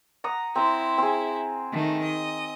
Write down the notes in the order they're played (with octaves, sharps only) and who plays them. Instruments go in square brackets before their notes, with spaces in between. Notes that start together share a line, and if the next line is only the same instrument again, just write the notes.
[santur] F#5 A#5 D#6
[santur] C4 A#5 C6 [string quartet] E4
[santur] C4 G#4
[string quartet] D#3 A3
D#5